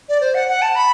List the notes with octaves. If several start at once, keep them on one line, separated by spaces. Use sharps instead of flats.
D5
C5
F#5
F#5
A5
B5